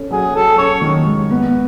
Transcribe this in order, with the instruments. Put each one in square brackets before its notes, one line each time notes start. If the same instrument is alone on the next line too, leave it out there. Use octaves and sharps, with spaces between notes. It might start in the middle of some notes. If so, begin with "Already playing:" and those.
Already playing: [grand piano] C#4 A4
[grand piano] F#3 [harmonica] G#4
[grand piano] F#3 [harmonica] A4
[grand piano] C#4 [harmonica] C#5
[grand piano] D#3
G#2
B3